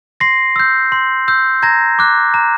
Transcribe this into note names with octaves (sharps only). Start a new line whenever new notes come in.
C6 A#6 C7
E6 G6
C6
E6 G6
A#5 G#6 A#6
D6 F#6
A#5